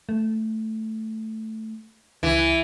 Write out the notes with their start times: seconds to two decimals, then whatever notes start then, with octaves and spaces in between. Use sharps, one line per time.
0.09 A3
2.23 C#2 E3